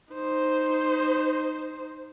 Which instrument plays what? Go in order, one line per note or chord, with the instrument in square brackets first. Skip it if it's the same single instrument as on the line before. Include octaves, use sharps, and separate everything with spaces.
[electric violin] D#4 C5